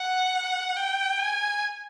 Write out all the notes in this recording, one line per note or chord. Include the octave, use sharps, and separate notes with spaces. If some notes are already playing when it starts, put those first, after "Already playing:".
Already playing: F#5
G5
G#5